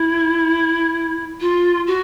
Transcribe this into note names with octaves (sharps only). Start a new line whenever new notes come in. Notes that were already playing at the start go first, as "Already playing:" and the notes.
Already playing: E4
F4
F#4